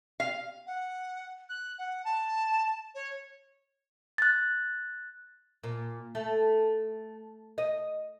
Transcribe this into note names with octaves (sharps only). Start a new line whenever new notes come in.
F5
F#5
F#6
F#5
A5
C#5
F#6 A6
A#2
A3
D#5